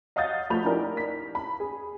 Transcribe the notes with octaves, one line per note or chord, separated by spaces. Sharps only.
D#5 F5 F#5 D#6 G6 A6
F3 A3 B5 G6 F7
D#4 E4 G4 A#4 D5
B6
B5
G#4